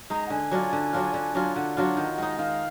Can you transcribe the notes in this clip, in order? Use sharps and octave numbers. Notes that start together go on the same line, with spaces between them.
G#3 D#4 A#5
F#5
D3 G#5
F#3 D4 F4
D3
F#3 D4 F4
D3
F#3 D4 F4
D3 F#5
F#3 D4 F4
D#3
G#3 D#4
D#3 F5